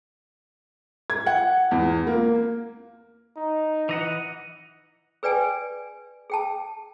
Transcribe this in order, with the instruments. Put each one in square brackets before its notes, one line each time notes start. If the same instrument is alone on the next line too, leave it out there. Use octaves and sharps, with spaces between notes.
[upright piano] G#6
F#5
E2
A#3
[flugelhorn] D#4
[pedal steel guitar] E3 D#5 F#5
[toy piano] G#4 B4 D5 G5 G#5
G#4 G5 A5